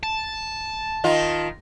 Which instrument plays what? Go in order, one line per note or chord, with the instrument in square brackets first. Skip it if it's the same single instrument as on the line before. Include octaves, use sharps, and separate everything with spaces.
[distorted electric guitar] A5
[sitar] D#3 D#4 F4